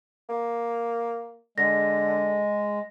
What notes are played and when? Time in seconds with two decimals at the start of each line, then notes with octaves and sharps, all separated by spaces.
0.29 A#3
1.58 D3 G#3 A#6